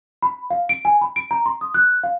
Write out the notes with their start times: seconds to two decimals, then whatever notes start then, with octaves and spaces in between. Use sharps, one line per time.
0.22 B5
0.50 F5
0.69 D7
0.85 G#5
1.01 B5
1.16 D7
1.31 A#5
1.46 C6
1.61 D#6
1.74 F#6
2.03 F5